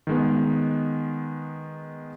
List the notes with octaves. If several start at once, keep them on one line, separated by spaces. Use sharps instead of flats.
D#3 G#3 B3